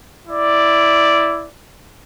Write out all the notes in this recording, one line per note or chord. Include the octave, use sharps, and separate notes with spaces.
E4 D5